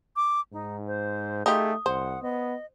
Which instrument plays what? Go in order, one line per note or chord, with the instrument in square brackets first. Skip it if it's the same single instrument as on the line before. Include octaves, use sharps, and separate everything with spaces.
[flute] D6
[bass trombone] G#2 [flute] D#4
[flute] C5
[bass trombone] A3 [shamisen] D#4 F4 G4 [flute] G#4 [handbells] D#6
[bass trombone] C2 [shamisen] C5 [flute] F#5
[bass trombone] B3 [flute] D#5